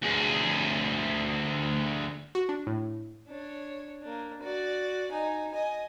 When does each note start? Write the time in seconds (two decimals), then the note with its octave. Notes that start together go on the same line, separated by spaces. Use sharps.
0.02 D2 G#4
2.35 F#4
2.49 D4
2.67 A2
3.28 D4 C#5
4.02 A#3 D4
4.42 F#4 D5
5.11 D#4 G#5
5.52 D#5 G#5